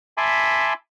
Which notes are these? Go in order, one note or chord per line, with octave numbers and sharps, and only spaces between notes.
E5 G#5 A5 B5 C6 D6